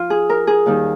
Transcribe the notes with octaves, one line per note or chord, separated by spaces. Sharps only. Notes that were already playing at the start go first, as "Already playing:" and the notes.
Already playing: F3 F4
G#4
A#4
G#4
D#2 D#3 G3